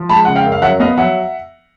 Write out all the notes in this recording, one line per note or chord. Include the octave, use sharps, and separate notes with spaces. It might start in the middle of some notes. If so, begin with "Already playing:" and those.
Already playing: F3
G#3 A5 B5
C#3 F#5
F5 G5
F#2
F5
F#3 E5 F#5
B3 D#5 F5
F#3 E5 F#5